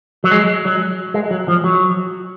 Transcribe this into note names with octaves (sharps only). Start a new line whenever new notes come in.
F#3
G#3
F#3
G#3
F#3
F3
F#3